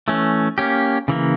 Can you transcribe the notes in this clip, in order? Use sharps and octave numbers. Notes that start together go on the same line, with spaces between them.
E3 A3 C#4
A#3 C#4 G4
C#3 E3 A#3